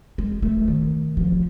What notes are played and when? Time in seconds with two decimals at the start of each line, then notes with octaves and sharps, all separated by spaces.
0.18 G#3
0.42 A3
0.68 D#3
1.17 F3